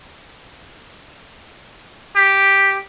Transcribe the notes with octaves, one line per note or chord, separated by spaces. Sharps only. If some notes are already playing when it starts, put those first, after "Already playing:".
G4